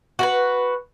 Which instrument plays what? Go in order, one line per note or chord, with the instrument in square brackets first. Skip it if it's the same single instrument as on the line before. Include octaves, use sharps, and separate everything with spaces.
[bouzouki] F#4 A#4 B4